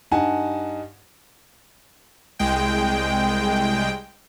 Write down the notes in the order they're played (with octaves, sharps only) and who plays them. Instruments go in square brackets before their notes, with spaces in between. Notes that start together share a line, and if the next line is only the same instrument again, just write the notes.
[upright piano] G2 D#4 F#5 G#5 A5
[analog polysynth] C2 G#3 G5